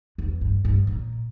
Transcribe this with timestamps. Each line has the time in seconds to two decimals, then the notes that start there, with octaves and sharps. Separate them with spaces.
0.18 E2
0.41 G2
0.65 G2
0.87 A#2